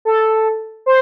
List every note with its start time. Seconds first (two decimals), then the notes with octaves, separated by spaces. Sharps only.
0.05 A4
0.86 C5